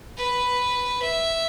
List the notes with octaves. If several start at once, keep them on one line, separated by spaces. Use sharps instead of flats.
B4
E5